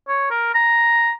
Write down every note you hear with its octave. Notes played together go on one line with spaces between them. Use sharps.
C#5
A#4
A#5